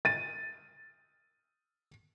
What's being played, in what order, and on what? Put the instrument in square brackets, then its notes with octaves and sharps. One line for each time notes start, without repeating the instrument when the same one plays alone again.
[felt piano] A6 D#7